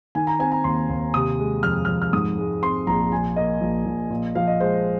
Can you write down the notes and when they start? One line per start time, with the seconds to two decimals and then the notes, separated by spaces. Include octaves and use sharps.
0.15 D#3 G#5
0.27 A#5
0.39 C4 G#5
0.52 A#5
0.64 D#2 C6
0.89 D#2
1.14 C3 D#6
1.39 G#3
1.63 F2 F6
1.85 F2 F6
2.02 F6
2.13 G#2 D#6
2.38 G#3
2.62 C4 C6
2.87 A#1 A#5
3.12 A#2 G#5
3.36 A#3 D#5
3.61 A#1
3.86 A#1
4.10 A#2
4.35 F3 F5
4.47 D#5
4.60 G#3 C5